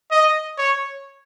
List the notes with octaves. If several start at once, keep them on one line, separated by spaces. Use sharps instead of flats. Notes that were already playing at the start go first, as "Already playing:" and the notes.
D#5
C#5